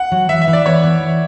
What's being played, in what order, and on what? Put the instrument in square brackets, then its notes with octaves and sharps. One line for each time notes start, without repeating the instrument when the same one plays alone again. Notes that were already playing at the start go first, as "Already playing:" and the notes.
Already playing: [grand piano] F#5
[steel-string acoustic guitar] F#3
[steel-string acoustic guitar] E3 [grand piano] E5
[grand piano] E5
[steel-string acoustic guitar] E3
[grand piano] D5
[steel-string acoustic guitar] B3 [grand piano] C#5
[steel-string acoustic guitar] E3
E4